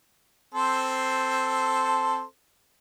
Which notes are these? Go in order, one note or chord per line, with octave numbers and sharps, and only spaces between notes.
C4 A4 C5